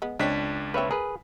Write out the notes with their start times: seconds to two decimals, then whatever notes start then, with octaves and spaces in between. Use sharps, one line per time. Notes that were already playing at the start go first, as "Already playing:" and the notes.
0.02 G#3 B3
0.19 C#2 G#3 C4 D4 C#5 B6
0.74 A#3 C4 B4 C#5 E5
0.91 G#4 A#4 B4